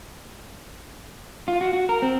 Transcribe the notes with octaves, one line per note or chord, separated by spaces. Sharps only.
F4
F#4
F#4
A#4
C4